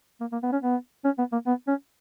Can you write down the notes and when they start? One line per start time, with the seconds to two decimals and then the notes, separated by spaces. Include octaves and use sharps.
0.21 A#3
0.32 A#3
0.43 B3
0.53 C#4
0.63 B3
1.05 C#4
1.18 B3
1.32 A#3
1.47 B3
1.68 C#4